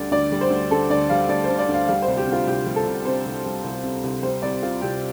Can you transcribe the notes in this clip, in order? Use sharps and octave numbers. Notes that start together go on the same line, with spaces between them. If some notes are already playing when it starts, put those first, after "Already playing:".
Already playing: D2 D3 G3 D5
D2 D5
G3
C5
D2
D3 A4
D2 D5
G3 F5
D2 D5
D3 C5
D5
D2
F5
G3 F5
C5
C2
G4
C3
F4
C2 G4
G3
A4
C2
C3 C5
C2
G3
C2
C3
C2
G3 C5
C2 D5
C3 F4
C2 G4